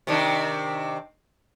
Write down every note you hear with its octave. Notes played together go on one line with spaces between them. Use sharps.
C3 D#3 D4